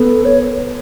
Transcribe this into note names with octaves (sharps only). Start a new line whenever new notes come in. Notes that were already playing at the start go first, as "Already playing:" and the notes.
Already playing: B3 A4
C#5